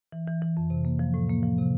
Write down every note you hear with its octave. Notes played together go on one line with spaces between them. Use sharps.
E3
E3
E3
F2
C3
A#3
F3
A2
A#3
F3
C3